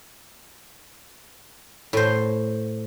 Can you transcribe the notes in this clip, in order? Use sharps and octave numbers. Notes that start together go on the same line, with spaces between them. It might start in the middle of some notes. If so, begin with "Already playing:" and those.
A2 C5